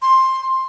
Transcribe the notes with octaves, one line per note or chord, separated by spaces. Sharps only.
C6